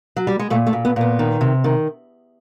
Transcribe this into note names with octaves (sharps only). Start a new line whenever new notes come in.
F#3
G3
G#3
A#2 A3
A3
A#2
B3
A#2 B3
D#3
C3
D#3